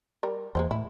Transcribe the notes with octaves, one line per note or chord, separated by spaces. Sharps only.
G3 A#4
E2 G#3 A#3 C5
A2 E4